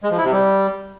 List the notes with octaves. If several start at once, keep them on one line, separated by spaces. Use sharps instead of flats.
G#3
F3
E4
C3
G3